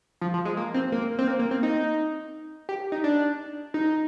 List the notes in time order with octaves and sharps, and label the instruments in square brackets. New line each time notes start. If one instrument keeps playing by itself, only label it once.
[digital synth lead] F3
F3
G#3
A#3
C4
A#3
C4
A#3
A#3
C4
D#4
G4
D#4
D4
D#4